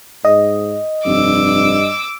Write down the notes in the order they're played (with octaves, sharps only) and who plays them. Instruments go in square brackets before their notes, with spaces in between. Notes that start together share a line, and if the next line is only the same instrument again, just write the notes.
[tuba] G#2 [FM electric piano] D#5
[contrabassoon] F1 [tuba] G2 [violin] D6 E6